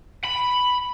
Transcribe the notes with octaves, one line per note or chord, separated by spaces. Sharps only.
B5